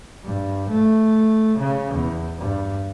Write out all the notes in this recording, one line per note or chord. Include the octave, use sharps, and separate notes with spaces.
G2
A3
C#3
E2
G2